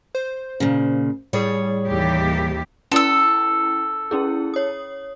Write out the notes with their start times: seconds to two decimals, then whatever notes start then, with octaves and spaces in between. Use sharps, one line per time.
0.15 C5
0.60 A#2 C#3
1.33 A2 G3 G#4 C#5
1.88 D#2 E3 G4
2.92 C#4 E4 A4 E6
4.11 C#4 E4 G#4
4.54 C#5 D#6